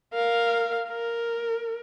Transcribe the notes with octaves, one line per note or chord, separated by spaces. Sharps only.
A#4 F5
A#4